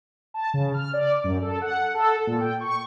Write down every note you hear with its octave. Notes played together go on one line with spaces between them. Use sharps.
A5
C#3
F6
D5
F#2
A4
F#5
A4
A#2
G5
C#6